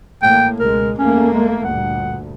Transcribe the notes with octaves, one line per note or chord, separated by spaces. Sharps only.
A1 A2 A#3 G5
C#2 B2 G#3 A#4
E2 A3 A#3 C#4
G#3
D2 G2 A#2 F#5